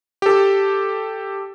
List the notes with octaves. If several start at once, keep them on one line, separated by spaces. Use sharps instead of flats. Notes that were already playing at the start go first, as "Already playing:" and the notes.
G4 A4